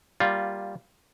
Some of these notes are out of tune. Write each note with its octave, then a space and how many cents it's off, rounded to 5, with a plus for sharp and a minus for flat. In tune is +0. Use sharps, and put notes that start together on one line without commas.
G3 +0 A#3 +5 F4 +0